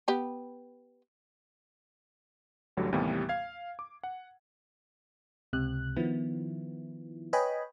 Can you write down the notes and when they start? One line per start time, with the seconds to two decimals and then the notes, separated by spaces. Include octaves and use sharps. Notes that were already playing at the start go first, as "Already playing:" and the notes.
0.08 B3 G4 B4
2.77 A1 D2 D3 F#3 G3
2.93 D#2 A2 C3 E3 G3 B3
3.29 F5 G#6
3.79 D6
4.03 F#5
5.53 C#2 C3 F#6
5.96 D#3 F3 B3 E4
7.33 B4 C#5 D#5 G5 G#5 B5